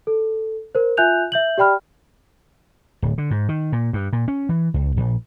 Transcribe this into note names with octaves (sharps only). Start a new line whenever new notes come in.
A4
A#4 C5
F4 E5 G#5 F#6 G6 F7
E5 G6 F#7
G4 D5 G5 B5 F6
D1
D3
G#2
D#3
A#2
G2
A#2
C#4
E3
C#2
A#1